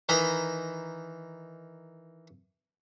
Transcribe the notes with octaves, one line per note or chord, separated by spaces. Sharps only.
D#3 E3 D#5 A#5 B5